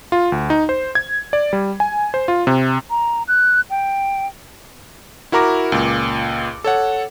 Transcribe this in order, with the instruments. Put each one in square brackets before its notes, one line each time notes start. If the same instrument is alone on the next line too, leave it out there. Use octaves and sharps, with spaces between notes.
[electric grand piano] F4
D2
D#4
C5
G#6
D5
G3
G#5
C5
F4
C3
[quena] A#5
F#6
G5
[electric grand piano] E4 F#4 A#4 A#5 D6
C#2 A#2
A4 C#5 F#5